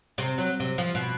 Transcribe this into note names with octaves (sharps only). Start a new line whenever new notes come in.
C3
F#3
C3
F3
B2